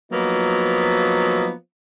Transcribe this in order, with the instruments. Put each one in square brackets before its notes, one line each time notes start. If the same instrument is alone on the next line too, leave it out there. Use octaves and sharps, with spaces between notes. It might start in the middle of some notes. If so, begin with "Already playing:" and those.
[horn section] F3 F#3 A#3 B3 D#4